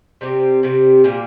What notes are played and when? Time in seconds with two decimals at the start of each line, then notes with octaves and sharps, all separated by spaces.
0.21 C3 G3 C4 G4
0.63 C3 G3 C4 G4
1.04 A#2 G3 A#3 F4